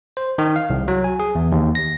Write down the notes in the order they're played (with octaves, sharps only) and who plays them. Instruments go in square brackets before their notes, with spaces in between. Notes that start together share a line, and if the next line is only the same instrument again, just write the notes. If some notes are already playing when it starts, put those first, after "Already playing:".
[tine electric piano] C5
D#3
F5
C2
F#3
G#5
G#4
E2
D#2
A#6